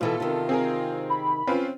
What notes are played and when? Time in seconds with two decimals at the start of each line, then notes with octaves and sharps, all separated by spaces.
0.01 B2 E3 B3 F4 A4
0.20 C3 D#3
0.49 C4 G#4 A#4
1.10 B5
1.47 C4 C#4 F4 B4